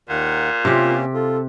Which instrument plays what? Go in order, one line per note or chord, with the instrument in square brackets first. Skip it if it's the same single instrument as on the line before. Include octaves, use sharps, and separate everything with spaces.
[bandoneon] D#2 D#3 F#5 [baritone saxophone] A#2
[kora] C3 G4 [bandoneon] A#3 C#4 [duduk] F4
[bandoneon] F4 [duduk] A4